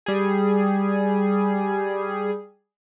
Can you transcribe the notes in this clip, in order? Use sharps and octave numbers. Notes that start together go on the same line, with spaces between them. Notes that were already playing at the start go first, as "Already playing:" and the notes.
G3 G#4